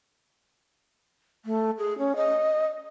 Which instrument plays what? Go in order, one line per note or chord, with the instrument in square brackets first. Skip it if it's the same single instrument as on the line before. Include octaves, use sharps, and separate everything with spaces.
[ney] A3
G#4
C#4
D#5